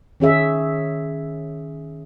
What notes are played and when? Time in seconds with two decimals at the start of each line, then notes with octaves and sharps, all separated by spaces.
0.20 D#3 C#4 G#4 E5